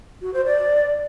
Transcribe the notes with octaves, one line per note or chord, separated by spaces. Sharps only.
F#4
C5
D5